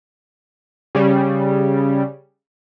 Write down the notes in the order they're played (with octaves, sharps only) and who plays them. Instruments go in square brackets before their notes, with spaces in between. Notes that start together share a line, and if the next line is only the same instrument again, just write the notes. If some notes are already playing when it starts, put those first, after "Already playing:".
[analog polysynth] C#3 G3